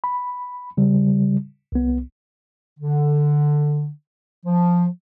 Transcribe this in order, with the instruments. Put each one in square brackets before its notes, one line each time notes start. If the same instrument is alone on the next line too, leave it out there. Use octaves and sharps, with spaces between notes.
[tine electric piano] B5
C#3 G3
C2 B3
[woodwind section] D3
F3